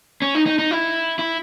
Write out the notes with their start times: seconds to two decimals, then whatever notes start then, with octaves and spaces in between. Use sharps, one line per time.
0.22 C#4
0.35 D#4
0.46 D#4
0.59 D#4
0.71 E4
1.19 E4